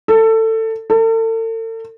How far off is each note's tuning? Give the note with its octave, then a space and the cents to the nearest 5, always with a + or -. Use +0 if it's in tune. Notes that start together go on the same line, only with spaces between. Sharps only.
A4 +20
A4 +40